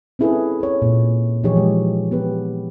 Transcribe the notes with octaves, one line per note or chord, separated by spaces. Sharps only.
C4 C#4 E4 G#4 A4 B4
G#4 C#5
A#2
E3 F3 D#4 G4 G#4 C#5
G#3
B3 G4 B4